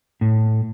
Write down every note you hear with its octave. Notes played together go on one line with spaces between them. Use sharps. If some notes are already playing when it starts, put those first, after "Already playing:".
A2